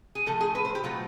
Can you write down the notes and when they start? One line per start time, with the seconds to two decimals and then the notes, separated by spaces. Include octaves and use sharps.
0.15 G#4
0.26 A2 F3 A3 A4
0.41 G#4
0.55 B4
0.65 C5
0.75 G4
0.83 B2 F#3 A3 F4